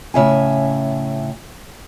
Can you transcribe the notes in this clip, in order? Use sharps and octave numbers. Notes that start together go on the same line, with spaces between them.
A2 C#3 E5 G#5